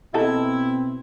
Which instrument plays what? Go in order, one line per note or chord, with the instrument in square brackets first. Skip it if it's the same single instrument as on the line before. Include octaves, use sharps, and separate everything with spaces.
[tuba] B2 [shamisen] E3 D#4 A4 [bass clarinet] C4 [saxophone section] E4